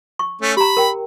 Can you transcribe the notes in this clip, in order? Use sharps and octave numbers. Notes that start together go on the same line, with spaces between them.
C#6
A3 C#4
G4 A#5 B5
A#4 G5